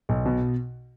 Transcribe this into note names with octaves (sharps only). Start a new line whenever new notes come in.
B1
B2